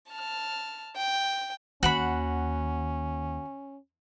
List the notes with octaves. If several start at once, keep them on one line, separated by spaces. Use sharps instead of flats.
A5 F6
G5
D#2 C#4 F#4 F#5 B5